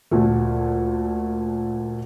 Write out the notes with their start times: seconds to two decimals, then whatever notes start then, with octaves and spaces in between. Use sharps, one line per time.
0.11 D2 A#2 A3